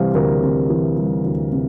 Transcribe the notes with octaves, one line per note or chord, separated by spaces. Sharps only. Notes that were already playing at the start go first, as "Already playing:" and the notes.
Already playing: C3 E3 G3 C5 F5
D2 A#4
C3
E3
G3
D2
C3